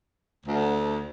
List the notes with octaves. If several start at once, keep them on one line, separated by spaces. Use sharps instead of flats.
D2